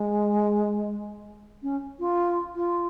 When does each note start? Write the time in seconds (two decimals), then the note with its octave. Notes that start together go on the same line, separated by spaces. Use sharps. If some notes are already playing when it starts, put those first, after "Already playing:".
Already playing: G#3
1.63 C#4
2.00 F4
2.56 F4